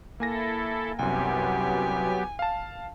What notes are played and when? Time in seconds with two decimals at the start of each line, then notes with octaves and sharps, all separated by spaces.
0.20 A#3 E4 A4 G#5 A#6
0.99 C2 F#2 F#3 B3 G4 G#5
2.39 F5 A5